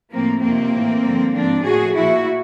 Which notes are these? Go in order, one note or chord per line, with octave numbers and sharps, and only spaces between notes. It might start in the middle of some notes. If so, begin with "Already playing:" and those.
A2 F3 A#3 C4
F2 C3 D#3 A#3 C4
A2 E3
G2 D3 F3
G#2 F3 C4 D4
A2 F3 F#4 G#4
A#2 F3 E4 F#4